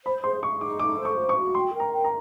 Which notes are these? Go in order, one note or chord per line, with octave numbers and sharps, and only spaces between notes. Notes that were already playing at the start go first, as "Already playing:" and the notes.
C5 B5
G#4 C6
G#4 C#6
D#4 D6
A4 D6
C5
C#6
F#4
C#6
F#4
G5 C6
A#4
A#5
G5
A#5